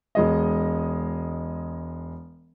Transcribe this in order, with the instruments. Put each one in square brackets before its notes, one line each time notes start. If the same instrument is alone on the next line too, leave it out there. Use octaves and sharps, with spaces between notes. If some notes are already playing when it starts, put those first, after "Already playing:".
[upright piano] E1 G#3 D#5